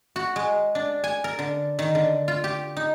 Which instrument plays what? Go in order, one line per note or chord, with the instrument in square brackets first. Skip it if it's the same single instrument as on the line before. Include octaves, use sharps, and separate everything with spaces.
[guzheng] F#4
G#3
D4
G#5
A#4
D3
D#3
D3
F4
G4
D#4